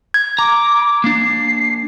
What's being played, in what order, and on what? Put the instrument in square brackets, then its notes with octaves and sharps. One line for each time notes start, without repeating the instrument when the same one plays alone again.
[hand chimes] G#6
[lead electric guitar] A#5 [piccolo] D6
[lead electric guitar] A#3 D4 [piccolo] C7